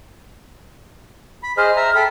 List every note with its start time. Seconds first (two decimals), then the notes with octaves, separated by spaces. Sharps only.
1.43 B5
1.58 G#4 C5 D#5 F6
1.76 E5 A#5
1.95 A4 G5 B5